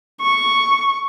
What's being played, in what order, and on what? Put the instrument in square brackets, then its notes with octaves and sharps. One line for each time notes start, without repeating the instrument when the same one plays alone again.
[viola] C#6